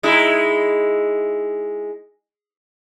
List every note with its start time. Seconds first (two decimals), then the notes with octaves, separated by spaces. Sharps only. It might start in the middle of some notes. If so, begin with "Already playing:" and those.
0.03 G#3 D#4 E4